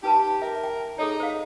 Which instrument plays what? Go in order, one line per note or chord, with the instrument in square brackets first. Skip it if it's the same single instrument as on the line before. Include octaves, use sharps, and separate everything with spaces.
[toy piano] D#4 B4 A5 [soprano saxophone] G4
[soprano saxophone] A#4 [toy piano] E5
[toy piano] G5
[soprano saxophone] D#4 [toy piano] G#4 A4 C#5
[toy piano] C5 F5